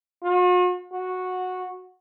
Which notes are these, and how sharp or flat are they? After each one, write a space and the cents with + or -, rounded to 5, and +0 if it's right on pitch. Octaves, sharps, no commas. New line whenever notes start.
F#4 -45
F#4 -10